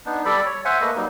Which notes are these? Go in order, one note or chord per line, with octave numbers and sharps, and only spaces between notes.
B3 D4 D#4
G3 A4 D5 B5
C#5
C5 E5 F#5 G#5
A3 A#3 B4 D#5
F#3 G3 A#3 D#4